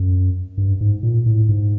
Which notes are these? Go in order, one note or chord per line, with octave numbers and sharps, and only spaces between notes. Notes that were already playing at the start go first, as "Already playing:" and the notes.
Already playing: F#2
G2
G#2
A#2
A2
G#2